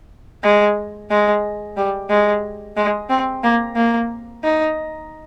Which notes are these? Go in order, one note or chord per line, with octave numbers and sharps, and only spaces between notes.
G#3
G#3
G3
G#3
G#3
C4
A#3
A#3
D#4